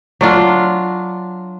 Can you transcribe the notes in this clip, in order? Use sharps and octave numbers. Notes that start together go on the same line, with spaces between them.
F#3 D4 F4